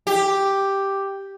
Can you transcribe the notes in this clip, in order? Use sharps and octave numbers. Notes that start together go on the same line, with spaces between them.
G4